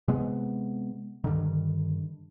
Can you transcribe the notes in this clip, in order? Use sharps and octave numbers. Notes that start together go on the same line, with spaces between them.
C3 G#3 B3
G2 D3 D#3